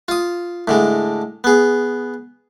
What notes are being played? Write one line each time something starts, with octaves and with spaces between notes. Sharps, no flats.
F4 D#6
A2 D3 G#3
B3 G#4